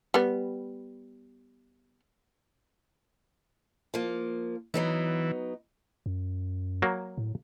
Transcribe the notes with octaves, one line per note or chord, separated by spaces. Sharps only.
G3 B3
F3 A#3
E3 F#3 B3 D#4
F#2
F#3 A#3
A2